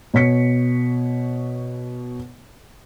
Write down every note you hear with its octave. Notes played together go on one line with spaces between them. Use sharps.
B2 C#5 B6 C#7